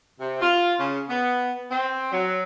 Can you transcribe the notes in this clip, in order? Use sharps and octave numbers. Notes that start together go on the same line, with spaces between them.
C3
F4
C#3
B3
C4
F#3